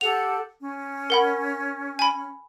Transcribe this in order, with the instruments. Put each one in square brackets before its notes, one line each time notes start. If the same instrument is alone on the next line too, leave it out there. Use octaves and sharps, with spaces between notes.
[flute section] G4 A4 F#5 [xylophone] F7
[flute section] C#4
[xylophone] A#4 F#5 B5
G#5 B5